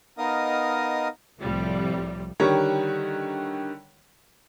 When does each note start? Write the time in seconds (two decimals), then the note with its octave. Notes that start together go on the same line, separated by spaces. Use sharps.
0.18 B3 D#4 A#4 D#5 F5 D#6
1.39 C2 A2 C3 F3 G3
2.40 D3 D#3 G3 A#4 C#5